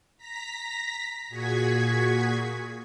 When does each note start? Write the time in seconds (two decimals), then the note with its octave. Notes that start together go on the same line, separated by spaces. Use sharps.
0.17 A#5 A#6 B6
1.28 A#2 F#4 G#4 C#6 G#6 B6